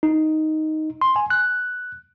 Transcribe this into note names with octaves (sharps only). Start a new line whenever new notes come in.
D#4
C6
G#5
F#6